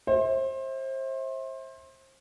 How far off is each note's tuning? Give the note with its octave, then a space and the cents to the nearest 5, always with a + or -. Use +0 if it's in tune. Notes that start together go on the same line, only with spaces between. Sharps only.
C5 +30 E5 -25